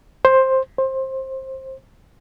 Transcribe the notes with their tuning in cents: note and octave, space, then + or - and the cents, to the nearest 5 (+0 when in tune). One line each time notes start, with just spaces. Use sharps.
C5 +10
C5 +20